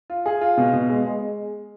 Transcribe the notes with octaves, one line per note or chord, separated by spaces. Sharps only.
F4
G#4
F4
B2
B2
G#3
G#3